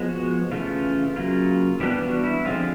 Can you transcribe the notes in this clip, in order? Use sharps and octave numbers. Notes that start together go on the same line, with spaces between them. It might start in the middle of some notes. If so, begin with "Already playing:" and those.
Already playing: F3 G#3 B3
F#4
C#3 E3 A3 C#4 F4
C#3 F#3 A#3 F4
E3 G3 B3 D4 G4
F#4
E4
D3 F3 G#3 C4 F4